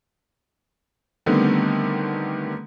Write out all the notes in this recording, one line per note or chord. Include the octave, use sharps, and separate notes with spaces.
D3 D#3 G3 A3 B3 C4